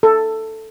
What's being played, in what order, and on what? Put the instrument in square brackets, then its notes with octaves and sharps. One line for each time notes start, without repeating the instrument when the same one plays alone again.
[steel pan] A4